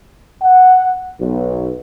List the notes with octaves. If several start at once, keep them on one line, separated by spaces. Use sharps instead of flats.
F#5
B1